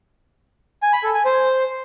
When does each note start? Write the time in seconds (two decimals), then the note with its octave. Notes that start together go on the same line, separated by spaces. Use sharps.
0.83 G#5
0.93 B5
1.04 A4
1.14 G#5
1.25 C5